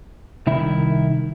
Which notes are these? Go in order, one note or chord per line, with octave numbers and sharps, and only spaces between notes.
C2 D#3 E4 E5